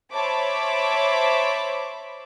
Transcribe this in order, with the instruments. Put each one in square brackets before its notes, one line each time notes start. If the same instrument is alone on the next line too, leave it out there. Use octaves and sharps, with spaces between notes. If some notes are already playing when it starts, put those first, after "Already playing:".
[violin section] C5 C#5 E5 A5 B5 D6